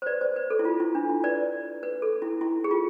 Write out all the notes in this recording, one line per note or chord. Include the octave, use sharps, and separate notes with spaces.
C5
B4 D5
C5
B4
A4
E4
F4
E4
D4
E4
B4 D5
B4
A4
E4
E4
G#4
F4